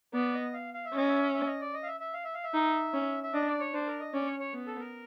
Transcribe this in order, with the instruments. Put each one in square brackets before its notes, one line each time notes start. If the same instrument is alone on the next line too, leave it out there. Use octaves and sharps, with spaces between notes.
[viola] B3 [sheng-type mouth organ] D5
[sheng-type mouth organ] D#5
F5
F5
E5
[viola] C#4 [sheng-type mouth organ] D#5
[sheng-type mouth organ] E5
E5
D#5
D5
D#5
F5
E5
E5
F5
E5
F5
E5
[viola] D#4
C#4
[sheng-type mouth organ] E5
[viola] D4 [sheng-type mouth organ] D#5
[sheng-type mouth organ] D5
C#5
[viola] D4 [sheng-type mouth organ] C5
[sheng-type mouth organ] A#4
D#5
[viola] C#4 [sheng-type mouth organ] D5
[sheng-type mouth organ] C#5
C#5
[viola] B3
[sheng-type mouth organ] A4
A#4